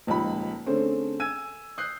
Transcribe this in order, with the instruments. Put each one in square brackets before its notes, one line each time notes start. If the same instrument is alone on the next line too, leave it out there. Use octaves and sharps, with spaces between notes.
[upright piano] D#1 C#2 F3 D#4 B5
D3 A3 C4 C#4 G#4 C5
G#5 E6 G#6 D#7
D#6 F#6 G6 C7